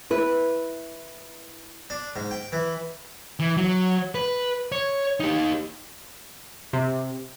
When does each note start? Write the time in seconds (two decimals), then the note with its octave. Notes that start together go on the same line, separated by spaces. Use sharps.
0.10 E4 B4
1.90 D4
2.16 G#2
2.31 G5
2.52 E3
3.40 E3
3.57 F#3
4.15 B4
4.72 C#5
5.20 D#4 G4
6.73 C3